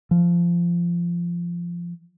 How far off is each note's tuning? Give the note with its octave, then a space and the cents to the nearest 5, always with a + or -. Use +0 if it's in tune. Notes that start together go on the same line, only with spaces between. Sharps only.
F3 -15